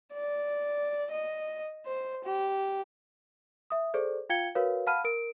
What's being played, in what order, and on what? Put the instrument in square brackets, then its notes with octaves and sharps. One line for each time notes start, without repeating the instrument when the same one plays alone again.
[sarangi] D5
D#5
C5
G4
[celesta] E5 D#6
G#4 A4 C5 D5
F4 F5 G5 G#6 C#7 G7
F#4 A#4 B4 C#5 F5
F5 F#5 A5 B5 F6 D#7
A#4 D7